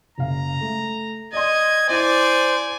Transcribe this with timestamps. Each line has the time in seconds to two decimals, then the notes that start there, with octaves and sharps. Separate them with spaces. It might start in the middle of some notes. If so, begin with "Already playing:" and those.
0.18 F#1 F5 A#5
0.61 A3
1.33 D5 D#5 C6 G#6
1.89 E4 C5 D5 G#5 G#6